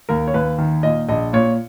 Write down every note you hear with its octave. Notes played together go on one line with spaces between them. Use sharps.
D#2 A#4
C#5
D#2 B4
D#3
A#2 D#5
A#1 D#5
A#2 C#5